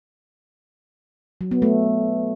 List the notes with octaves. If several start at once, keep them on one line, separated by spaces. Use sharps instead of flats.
F#3
B3
A3